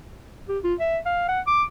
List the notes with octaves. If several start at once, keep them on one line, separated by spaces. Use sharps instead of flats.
G4
F4
E5
F5
F#5
D6